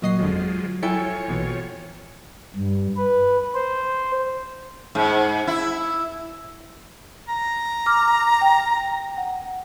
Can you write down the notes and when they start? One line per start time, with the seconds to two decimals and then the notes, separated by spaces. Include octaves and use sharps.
0.02 A#2 F#3 D#5 C7
0.19 G1 F2 D3 F3 G#3
0.82 F3 F#3 E4 A4 C#5 G5 G#5 C#7
1.28 A#1 B2 E3
2.56 G2
2.96 B4
3.55 C5
4.95 G#2
5.47 E4
7.29 A#5
7.86 D6 F6
8.41 G5
9.17 F#5